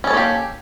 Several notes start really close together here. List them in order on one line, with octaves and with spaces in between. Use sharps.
C#4 A4 C#5 A#3 G4